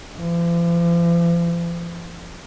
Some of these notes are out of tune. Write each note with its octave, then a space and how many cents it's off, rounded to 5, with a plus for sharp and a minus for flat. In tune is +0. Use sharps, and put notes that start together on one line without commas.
F3 -45